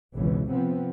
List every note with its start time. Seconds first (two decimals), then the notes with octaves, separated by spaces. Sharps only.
0.15 G#1 C#2 B2 E3
0.51 C3 F3 B3 C4